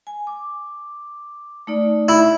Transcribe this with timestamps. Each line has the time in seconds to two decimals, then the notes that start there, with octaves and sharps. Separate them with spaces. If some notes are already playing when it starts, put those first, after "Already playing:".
0.07 G#5
0.27 D6
1.67 A3 D#4 D5
2.09 E4